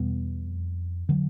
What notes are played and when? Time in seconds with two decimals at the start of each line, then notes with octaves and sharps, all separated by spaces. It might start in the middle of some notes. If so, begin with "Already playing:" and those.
Already playing: E2 B2 G3 B3
0.46 F2
1.09 D3 F#3